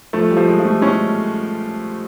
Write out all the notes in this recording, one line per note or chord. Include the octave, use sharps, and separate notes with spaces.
F3 A3
G3
F3
G#3
F3
A3
G#3 C#4